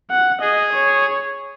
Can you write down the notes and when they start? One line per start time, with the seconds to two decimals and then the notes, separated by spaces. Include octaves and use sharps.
0.11 F#5
0.41 G#4 D#5
0.73 C#5